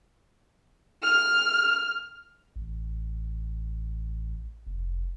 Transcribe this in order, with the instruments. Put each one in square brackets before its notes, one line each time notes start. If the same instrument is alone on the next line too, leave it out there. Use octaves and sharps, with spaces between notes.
[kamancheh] F6
[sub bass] A1
F1